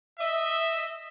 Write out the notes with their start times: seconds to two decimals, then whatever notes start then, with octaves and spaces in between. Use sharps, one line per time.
0.19 D#5 E5